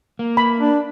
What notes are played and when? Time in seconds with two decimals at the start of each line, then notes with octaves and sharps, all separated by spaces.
0.19 A#3
0.37 B5
0.60 D4